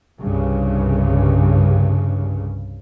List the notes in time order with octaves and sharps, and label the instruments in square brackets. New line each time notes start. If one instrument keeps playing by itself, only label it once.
[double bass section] C2 G2 C#3